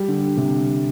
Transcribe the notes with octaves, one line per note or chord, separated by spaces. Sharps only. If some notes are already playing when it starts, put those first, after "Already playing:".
Already playing: G3
D3
C3